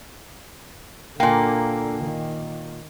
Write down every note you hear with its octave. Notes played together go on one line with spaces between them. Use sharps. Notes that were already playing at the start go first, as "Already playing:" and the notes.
A#2 D3 A#3 G5 G#5
D#3